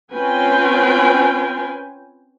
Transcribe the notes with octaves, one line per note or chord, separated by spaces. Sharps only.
C4 C#4 F4 B4 G5 G#5